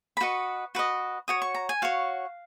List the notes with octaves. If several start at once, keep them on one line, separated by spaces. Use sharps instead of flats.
B5
F#4 B4 D#5 C#6
F#4 B4 D#5
F#4 C#5 D#6
C#6
A#5
G#5
F#4 C#5 F5